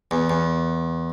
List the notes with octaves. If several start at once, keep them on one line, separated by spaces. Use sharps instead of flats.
E2
E2